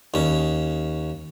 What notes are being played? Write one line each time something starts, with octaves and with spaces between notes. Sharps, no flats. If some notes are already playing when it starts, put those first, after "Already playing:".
D#2 C#4